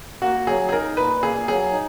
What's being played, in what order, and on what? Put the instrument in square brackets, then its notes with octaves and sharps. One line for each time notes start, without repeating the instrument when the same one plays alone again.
[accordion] A#3 [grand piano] F#4
[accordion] F#3 [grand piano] G#4
[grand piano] G#4
[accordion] D#4 [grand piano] A#4
[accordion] A#2 [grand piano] B4
[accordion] A#3 [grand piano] G#4
[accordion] F#3 [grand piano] G#4
[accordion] D#4